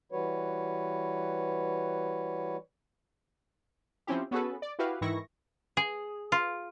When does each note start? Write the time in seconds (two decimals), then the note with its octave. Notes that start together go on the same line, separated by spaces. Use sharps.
0.12 E3 G3 F#4 B4 C#5
4.07 F3 C4 C#4 E4 G4
4.31 B3 C#4 F#4 G#4 A4 B4
4.62 D5
4.79 E4 F#4 G4 B4 F5
5.01 G#2 D#3 E3 E4 C#6 A#6
5.77 G#4
6.32 F4